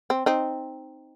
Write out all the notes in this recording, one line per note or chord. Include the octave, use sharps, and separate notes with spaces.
C4
C4 D#4